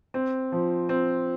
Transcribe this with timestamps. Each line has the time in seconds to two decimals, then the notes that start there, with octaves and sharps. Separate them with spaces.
0.14 C4
0.52 F3
0.89 C4